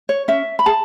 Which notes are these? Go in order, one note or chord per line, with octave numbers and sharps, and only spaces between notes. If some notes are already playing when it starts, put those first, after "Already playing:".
C#5
C#4 E5
B5
G#4 A5